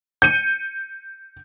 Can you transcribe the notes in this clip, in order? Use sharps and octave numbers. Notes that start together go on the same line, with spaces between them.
G6 C#7 D#7